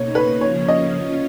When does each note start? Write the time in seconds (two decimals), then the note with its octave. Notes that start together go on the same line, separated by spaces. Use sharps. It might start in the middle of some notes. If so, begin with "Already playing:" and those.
Already playing: B2 A#3 D#4 C#5
0.15 B4
0.41 C#3 F3 A#3 C#4 C#5
0.68 D#5
0.95 C#4 F4